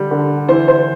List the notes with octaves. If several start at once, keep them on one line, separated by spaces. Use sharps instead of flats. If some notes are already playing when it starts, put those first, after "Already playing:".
Already playing: D3 G3
D3
E3 C5
C5